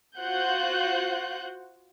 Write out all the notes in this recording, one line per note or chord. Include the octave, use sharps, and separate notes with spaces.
F4 F#4 C5 F#5 F#6 G6